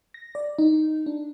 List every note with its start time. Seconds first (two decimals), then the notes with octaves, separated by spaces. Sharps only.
0.14 A#6
0.35 D5
0.58 D#4
1.06 D4